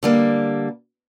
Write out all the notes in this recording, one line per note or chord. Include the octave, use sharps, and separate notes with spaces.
D3 G3 A#3